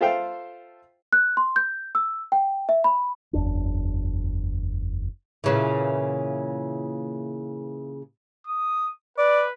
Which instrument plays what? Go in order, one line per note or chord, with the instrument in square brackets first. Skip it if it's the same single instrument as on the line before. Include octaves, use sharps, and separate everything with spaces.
[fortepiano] F4 A4 C5 E5 F5 G5
[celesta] F#6
C6
G6
E6
G5
E5
B5
[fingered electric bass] F#1 E2 D4
[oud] A#2 C#3 E3
[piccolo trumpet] D#6
[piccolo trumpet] B4 [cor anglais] D5